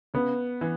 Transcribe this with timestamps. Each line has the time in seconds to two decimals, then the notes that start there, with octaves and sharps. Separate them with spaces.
0.14 C#3 B3
0.61 E3